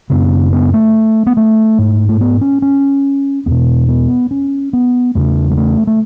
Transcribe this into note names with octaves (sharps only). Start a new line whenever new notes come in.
F#2 C#3 B3
B3
A3
B3
A3
G#2
A3
B3
C#4
C#4
E2 B2 B3
B3
C#4
B3
E2 C#3 A3
G#3
A3
A3